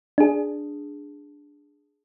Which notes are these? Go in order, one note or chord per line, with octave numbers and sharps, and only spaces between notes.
D4 G#4